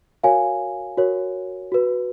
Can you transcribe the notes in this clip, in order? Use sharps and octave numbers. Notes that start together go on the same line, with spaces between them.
F#4 A#4 C#5 F5 G#5
F#4 A#4 C#5
F#4 B4